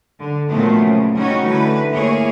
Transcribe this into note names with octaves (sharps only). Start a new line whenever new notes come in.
D3
A#2 D#3 F3 F#3 A3 B3
C#3
F#3 G3 C#4 D#4 F#4 C#5
D3 E3 A3 B4
A#3 E4 G#4 C#5